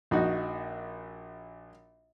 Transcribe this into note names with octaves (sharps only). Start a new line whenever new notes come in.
A#1 D#4 F#4